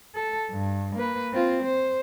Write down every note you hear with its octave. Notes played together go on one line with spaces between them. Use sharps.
A4
G2
A#3 B4
C4 F4
C5